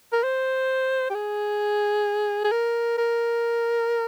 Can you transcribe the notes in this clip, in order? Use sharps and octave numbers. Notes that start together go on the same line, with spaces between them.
A#4
C5
G4
G#4
G#4
A#4
A#4